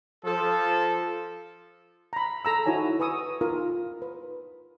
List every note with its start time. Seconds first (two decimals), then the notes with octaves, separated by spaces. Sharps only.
0.25 F3 A4
2.13 A#5 B5
2.45 A4 A#5 E6
2.66 D#4 E4 F#4 C#5 G#5
3.00 B4 G#5 C#6 D#6 E6
3.41 D#4 F4 A#4
4.02 B4